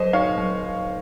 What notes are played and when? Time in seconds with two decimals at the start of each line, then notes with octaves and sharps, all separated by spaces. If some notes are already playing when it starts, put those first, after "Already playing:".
Already playing: F#3 A4 C5 D#5
0.13 D#4 C#5 F5
0.38 F#3